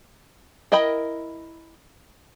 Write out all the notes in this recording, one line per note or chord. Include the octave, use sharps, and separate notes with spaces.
E4 A#4 D#5 G5 B5